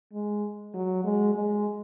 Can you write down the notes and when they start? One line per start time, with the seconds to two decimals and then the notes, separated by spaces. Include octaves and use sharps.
0.13 G#3
0.74 F#3
1.04 G#3
1.35 G#3